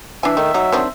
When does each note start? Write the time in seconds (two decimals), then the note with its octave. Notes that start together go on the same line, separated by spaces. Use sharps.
0.23 E3 D4 E5 G#5
0.37 D#3 A3
0.54 F#3 D#4
0.72 D#3 C4 D4